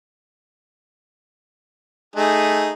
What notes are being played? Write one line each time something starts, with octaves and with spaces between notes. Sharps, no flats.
A3 D#4 G#4